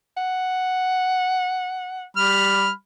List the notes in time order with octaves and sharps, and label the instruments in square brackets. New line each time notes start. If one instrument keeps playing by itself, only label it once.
[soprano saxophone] F#5
[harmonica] G3 B5 F6